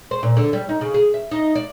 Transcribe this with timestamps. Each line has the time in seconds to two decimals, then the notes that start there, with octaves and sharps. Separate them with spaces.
0.11 C5
0.23 A#2
0.37 D3
0.53 G3
0.69 D#4
0.81 C#3
0.94 G#4
1.14 E5
1.31 D#4
1.55 D5